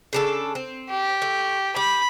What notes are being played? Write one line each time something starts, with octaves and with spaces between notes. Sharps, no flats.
C#3 D4 A4
C4
G4
A3
G4 B5